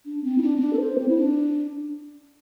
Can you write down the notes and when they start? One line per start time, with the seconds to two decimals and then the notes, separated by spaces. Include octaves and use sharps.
0.06 D4
0.23 C4
0.38 E4
0.42 D4
0.56 C4
0.60 D4
0.73 A4
0.79 C5
0.98 C4
1.09 E4
1.16 D4